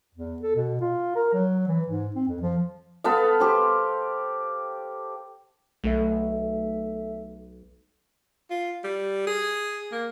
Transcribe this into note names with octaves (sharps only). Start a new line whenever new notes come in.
E2
A4
B2
F4
A#4
F#3
E3
G#2
C4
F2
F3
B3 A4 F5
G4 C5
B1 A3 A4 E5
F4
G3
G#4
A#3